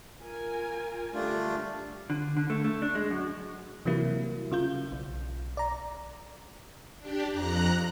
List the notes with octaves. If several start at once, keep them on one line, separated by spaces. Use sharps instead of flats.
F4 A#4 G#5
D3 G3 A3 D4 F4
D3
D3
A3
A3
D4
G#3
F#2
C3 E3 F#3 G3 A#3 E4
C#3 F4 G6
B1
D5 A#5
D4 G4
F2 A#5 F#6